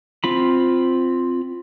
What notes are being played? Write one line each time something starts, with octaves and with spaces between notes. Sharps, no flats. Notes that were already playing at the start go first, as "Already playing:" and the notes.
C4 F4 B5